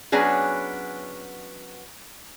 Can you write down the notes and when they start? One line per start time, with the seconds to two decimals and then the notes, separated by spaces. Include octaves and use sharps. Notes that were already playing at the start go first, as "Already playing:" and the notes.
0.12 F#3 B3 C#4 D4 G#4